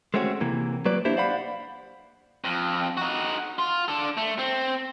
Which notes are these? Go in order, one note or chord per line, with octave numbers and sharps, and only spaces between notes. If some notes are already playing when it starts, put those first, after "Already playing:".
G#3 A3 C4 C#4 F#4
C3 E3 A#3
F#3 A#3 B4 D5
A#3 D4 E4 G4 C5
C5 D5 F5 F#5 B5
F2
D#4 F#4
F4
D4 A4
A3
C4